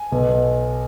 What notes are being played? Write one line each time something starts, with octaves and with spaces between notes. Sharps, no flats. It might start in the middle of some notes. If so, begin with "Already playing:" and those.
Already playing: G#5
B1 B2